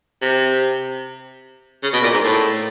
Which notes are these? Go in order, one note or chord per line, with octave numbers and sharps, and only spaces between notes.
C3
C#3
B2
A#2
G#2
A2